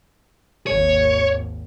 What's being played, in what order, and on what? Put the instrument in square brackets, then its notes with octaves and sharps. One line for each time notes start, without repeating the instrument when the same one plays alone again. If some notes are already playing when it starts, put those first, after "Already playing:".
[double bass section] G#1 D#2 [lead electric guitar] C#5